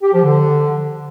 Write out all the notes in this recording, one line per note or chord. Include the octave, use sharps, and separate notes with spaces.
G4
F3
D3